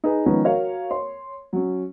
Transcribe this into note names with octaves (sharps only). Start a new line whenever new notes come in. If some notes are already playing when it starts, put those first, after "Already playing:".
D#4 G#4 B4
D#3 F3 G#3 B3 C#4 D#4
F#4 A#4 C#5 F5
C#5 C6
F#3 C#4